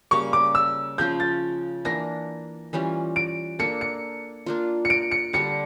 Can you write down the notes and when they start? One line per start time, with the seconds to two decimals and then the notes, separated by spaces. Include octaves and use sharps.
0.11 C#3 G3 A#3 C#6
0.33 D6
0.55 E6
0.98 C#3 F3 C#4 F4 G6
1.20 A6
1.85 E3 A#3 D4 A#6
2.73 E3 G3 C#4 F4
3.16 D7
3.59 A#3 D4 A4 C#7
3.81 C#7
4.46 A#3 D4 F4
4.85 C#7
4.90 D7
5.11 C#7
5.33 D3 G3 D4 C#7